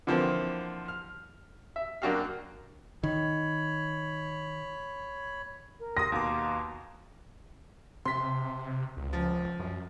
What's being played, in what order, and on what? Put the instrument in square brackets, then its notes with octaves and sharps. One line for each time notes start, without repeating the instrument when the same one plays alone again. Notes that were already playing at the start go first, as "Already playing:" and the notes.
[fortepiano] D3 E3 F3 A#3 C4
F6
E5
F#2 A#3 D4 F#4 G4 F5
[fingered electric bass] D#3 [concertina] C#5 B5
[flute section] A#4
[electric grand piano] C6 D#6 [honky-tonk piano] A#6
[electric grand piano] D#2 B2 D6 [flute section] F5 A#5 C6
[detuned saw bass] C3 [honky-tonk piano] C6 B6
[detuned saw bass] C#2
[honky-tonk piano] F3
[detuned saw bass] F#2